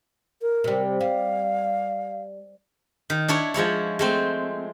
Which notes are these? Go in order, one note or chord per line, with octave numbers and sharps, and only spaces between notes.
A#4
C3 G3
G3 F5
D#3
D4 E4 C#5
F3 G#3 E4 C#5
G#3 A3 C4